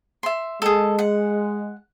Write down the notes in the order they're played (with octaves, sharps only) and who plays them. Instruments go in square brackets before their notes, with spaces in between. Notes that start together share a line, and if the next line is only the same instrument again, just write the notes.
[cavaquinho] E5 C6
[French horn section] G#3 [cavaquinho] G#4 A4
[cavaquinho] F#5